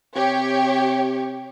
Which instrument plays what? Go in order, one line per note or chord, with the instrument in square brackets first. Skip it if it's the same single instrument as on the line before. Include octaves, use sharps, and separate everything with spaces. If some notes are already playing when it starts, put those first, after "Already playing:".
[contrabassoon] C3 [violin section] G4 C#5